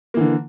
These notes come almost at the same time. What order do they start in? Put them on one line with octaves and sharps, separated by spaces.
A#3 E3 D3